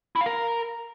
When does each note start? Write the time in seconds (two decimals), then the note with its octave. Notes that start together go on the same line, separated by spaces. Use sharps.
0.16 E4
0.21 F5
0.26 A#4